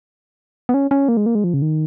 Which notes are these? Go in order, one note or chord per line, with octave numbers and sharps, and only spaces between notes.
B3
C#4
C#4
A#3
G#3
A#3
G#3
F3
C#3
D#3